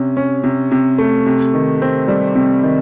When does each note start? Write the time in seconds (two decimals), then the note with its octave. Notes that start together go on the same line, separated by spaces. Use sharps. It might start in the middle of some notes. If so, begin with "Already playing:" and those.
Already playing: C3 C#4
0.17 C#4
0.44 C3
0.71 C3
0.98 A3
1.26 C3
1.54 D#3
1.82 C4
2.08 G3
2.35 C3
2.63 D#3